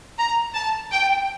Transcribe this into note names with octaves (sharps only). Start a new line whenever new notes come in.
A#5
A5
G5